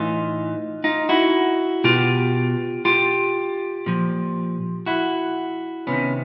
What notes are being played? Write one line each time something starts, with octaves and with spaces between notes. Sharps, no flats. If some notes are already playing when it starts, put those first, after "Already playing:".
Already playing: A2 E3 D#4 F4
D#4 F4
E4 F#4
B2 F4 G4
F4 G4
A#2 F3
E4 F#4
C3 D#3 B3 C#4